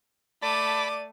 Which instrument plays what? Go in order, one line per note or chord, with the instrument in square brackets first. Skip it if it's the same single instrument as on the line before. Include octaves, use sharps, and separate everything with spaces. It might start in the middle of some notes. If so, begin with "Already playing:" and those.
[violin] A3 D#7 [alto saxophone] D5 [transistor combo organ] A5 B5 [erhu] D6